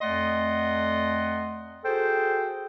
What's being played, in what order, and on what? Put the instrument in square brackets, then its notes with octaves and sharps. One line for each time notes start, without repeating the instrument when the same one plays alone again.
[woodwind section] F2 A3 D5 D#5 F#5 C6
F#4 G#4 A4 C5 G5